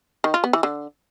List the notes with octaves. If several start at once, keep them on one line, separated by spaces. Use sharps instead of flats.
D#3
F4
B3
E3
D3